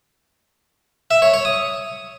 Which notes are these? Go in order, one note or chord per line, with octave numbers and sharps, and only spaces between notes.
E5
C#5
C#5
D#6